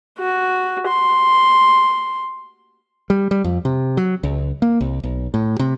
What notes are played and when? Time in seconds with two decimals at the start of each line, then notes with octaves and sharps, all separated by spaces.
0.19 F#4
0.88 C6
3.10 G3
3.31 G3
3.44 F2
3.65 C3
3.97 F#3
4.23 C#2
4.62 A#3
4.81 C2
5.03 B1
5.34 A2
5.59 C3